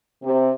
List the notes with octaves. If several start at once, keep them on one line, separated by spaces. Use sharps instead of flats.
C3